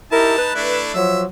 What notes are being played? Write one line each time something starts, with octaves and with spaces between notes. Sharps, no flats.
D#4 E4 G4 A#4 A5
B4
A3 D4 E4
F3 F#3 E5